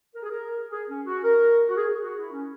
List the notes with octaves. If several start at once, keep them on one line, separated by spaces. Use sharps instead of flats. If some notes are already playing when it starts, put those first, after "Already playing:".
A#4
G#4
A#4
G#4
C#4
F#4
A#4
F#4
G#4
F#4
E4
C#4